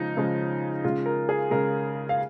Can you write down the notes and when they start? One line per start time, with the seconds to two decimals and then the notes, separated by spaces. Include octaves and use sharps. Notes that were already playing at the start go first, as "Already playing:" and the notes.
Already playing: C#3 F3 G#3 D#4
0.17 C#3 F3 G#3
0.84 C#3 G#3 F4
1.06 A#4
1.29 G#4
1.51 C#3 G#3 A#4
2.09 F5